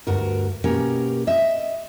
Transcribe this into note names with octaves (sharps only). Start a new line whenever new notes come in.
D2 G2 F#4 A#4
B2 A#3 C#4 G4 A#4
D#5 E5